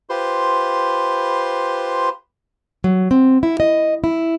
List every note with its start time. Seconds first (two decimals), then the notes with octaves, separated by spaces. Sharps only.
0.10 F4 G4 B4 C5 C6
2.84 F#3
3.11 C4
3.43 E4
3.60 D#5
4.04 E4